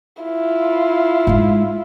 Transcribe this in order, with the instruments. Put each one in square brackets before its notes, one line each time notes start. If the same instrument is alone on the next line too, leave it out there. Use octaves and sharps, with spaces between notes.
[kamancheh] E4 F4
[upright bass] G#2 G#3